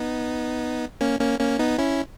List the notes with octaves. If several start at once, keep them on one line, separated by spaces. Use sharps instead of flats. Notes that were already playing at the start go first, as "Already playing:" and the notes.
Already playing: B3 D#4
A#3 C#4
A#3 C#4
A#3 C#4
B3 D#4
C#4 E4